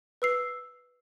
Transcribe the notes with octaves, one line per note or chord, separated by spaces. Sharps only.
B4 E6 C7